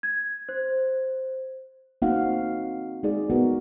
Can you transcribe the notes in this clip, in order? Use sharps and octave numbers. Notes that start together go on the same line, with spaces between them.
G#6
C5
A#3 C4 D#4 F#4 F5 F#5
G#3 D#4 G#4 D5
B3 D#4 F#4 A#4